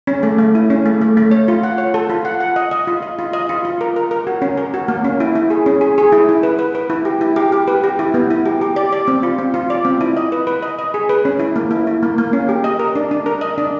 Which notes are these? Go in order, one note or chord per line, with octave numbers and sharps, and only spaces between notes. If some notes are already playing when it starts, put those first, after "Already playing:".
C#4
A3
A3
E4
C#4
A3
A3
A3
C#5
F4
F#5
C#5
A4
F4
F#5
F#5
D#5
D#5
F4
D#5
F4
D#5
F4
F4
A#4
A#4
A#4
F#4
C#4
A#4
F#4
A#3
C#4
E4
E4
G#4
C#4
G#4
G#4
E4
E4
B4
B4
B4
E4
G4
E4
G4
G4
B4
G4
E4
B3
E4
G4
G4
D5
D5
C4
F4
C4
F4
D5
C4
E4
D#5
B4
B4
D#5
D#5
G#4
B4
C#4
E4
A#3
E4
E4
A#3
A#3
C#4
G4
D#5
A#4
D4
D4
A#4
D#5
D4